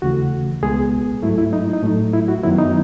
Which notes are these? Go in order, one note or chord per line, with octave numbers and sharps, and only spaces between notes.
D#2 C#3 E3 A3 F#4
C#2 B2 G#3 B3 G#4
G#2 F#3 A3 E4
E4
D#4
D#4
A2 F#3 A3
E4
F#4
F#2 D#3 F#3 B3 E4
D#4